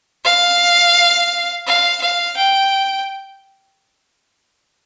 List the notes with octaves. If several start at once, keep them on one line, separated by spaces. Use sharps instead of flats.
F5
F5
F5
G5